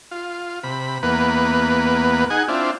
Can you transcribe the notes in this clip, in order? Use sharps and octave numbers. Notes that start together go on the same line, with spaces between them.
F4
C3 B5
E2 A#3 B3 B4
D#4 G#4 F#5 G#5
C4 D4 E4 F4